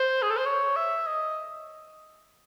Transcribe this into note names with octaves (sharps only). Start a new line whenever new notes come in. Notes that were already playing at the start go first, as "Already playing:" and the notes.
Already playing: C5
G#4
A4
C5
C#5
E5
D#5